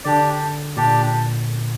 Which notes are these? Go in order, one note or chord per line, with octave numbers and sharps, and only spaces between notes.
D3 D4 G4 D5
A#2 D4 G4 D5